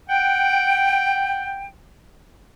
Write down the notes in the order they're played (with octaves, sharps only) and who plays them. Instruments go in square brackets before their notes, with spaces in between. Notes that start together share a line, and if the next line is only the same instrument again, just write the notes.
[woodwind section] F#5 G5